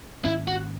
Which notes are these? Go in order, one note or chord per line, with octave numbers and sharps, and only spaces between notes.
G#2 D#3 A#3 C#4 E4
F#4